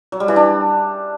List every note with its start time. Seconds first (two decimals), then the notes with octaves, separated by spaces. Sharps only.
0.12 F#3
0.20 G3
0.28 E3
0.36 D4